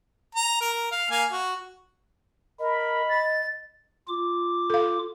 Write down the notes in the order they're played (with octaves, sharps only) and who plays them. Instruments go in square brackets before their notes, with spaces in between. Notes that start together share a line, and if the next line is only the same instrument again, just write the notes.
[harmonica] A#5
A#4
F5
A#3 F5 G#5
F#4
[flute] A#4 [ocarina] D#5 [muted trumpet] B5
[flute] A6
[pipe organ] F4 D6
[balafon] A4 F5